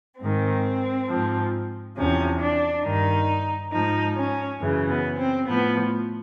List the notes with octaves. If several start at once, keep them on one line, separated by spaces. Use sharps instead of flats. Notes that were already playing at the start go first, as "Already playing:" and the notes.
G#2 D#3 C4
G#2 F3
E2 C3 F3 C#4
D4
G2 D#3 D#4
G#2 F3 D#4
C#4
F#2 C#3 E3
B3
C4
A2 F3 B3